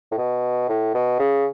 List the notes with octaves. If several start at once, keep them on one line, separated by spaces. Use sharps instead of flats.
A2
B2
A2
B2
C#3